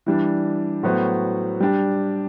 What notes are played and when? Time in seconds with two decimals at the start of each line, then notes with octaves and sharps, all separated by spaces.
0.06 E3 G3 D4
0.83 A2 F#3 B3 F#4 C5
1.60 G3 D4 G4